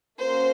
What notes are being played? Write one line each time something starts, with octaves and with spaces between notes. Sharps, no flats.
A#3 C#4 F#4 C5